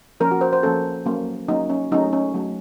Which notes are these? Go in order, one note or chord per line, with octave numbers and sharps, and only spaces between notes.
F3 A#3 C#4 A#4
F#4
C5
C5
F3 A#3 C#4 A4
F#3 A#3 C#4
F#3 A#3 C#4 D#4
C#4
F#3 A3 C#4 D#4
C#4
F#3 A3 C#4